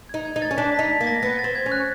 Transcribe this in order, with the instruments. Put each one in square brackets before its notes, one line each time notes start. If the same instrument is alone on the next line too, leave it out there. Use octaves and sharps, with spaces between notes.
[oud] D#4 [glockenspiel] G#6
[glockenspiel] G#6
[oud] D#4
[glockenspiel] A6
[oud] C#4
[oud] D4 [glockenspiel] B6
[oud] D#4 [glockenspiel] B6
[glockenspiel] B6
[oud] A#3
[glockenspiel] A#6
[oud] B3 [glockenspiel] A#6
[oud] C4 [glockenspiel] A6
[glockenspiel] G#6
[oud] C#4
[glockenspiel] F#6